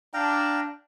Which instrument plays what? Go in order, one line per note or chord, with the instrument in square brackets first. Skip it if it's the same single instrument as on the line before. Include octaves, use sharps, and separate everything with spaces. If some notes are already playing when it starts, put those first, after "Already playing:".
[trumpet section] D4 [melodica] F5 G5 A#5